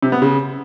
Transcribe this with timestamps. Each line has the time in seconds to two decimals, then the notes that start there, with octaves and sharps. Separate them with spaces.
0.03 C3
0.12 B3
0.22 C#3